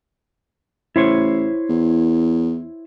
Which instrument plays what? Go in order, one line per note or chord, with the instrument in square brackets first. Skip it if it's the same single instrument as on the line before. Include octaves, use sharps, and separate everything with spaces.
[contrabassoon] A1 [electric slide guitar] E4 C5 C#5
[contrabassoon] E2